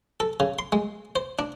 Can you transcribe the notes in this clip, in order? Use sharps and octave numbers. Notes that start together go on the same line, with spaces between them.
A4
C#3
C6
G#3
C5
D4